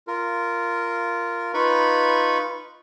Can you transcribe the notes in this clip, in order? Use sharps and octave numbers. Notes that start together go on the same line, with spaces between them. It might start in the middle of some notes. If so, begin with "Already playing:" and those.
F4 A#4
D#4 F4 B4 B5 C#6